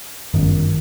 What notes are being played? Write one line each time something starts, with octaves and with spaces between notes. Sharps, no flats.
G1 F#2 D#3